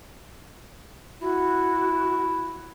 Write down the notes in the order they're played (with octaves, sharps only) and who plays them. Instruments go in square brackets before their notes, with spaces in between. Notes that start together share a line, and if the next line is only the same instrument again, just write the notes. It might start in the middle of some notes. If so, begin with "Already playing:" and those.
[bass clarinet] E4 [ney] F#4